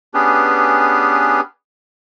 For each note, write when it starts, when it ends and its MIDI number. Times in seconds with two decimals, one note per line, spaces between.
0.14 1.41 59
0.14 1.41 61
0.14 1.41 62
0.14 1.41 67
0.14 1.41 68
0.14 1.41 71